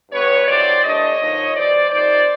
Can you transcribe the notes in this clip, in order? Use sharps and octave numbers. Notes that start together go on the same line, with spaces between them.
G2 D3 G3 B3 B4 C#5
F2 C3 D#3 F#3 C5 D5
G2 E3 A3 D4 C#5 D#5
D3 F3 A#3 D#4
E2 B2 G3 C5 D5
C3 F3 A#3 D#4 C5 D5